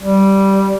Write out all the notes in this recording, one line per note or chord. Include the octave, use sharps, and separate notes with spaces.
G3